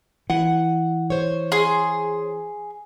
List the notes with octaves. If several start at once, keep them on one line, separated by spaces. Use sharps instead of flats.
E3 F#5
C5 C#5
G#4 C6